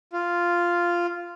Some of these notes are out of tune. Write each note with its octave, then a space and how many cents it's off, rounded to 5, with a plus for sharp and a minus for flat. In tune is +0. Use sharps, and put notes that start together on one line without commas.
F4 -5